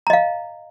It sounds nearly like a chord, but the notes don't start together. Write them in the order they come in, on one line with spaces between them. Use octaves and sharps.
A#5 D#5 F5